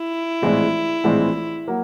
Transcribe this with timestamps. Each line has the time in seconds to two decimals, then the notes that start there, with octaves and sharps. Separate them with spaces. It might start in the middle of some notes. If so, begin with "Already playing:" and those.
Already playing: E4
0.42 A#1 A2 E3 G#3 C4
1.04 A#1 A2 E3 G#3 C4
1.68 F#3 A#3